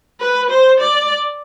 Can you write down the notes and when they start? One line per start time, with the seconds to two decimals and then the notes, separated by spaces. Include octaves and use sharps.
0.21 B4
0.50 C5
0.80 D5